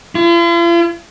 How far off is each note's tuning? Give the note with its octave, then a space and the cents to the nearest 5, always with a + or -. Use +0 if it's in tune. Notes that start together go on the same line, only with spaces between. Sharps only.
F4 -45